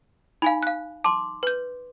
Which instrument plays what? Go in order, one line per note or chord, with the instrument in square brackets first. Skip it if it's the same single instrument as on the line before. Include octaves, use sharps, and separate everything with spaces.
[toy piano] D#4 [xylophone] F5 G#5 B5
[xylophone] F5 F#6
[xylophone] A5 [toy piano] C6 D6
[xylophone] B4 G6